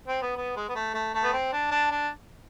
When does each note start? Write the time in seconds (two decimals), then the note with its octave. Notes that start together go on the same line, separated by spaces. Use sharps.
0.08 C4
0.22 B3
0.37 B3
0.56 G#3
0.69 B3
0.75 A3
0.94 A3
1.14 A3
1.24 B3
1.33 C4
1.53 D4
1.71 D4
1.91 D4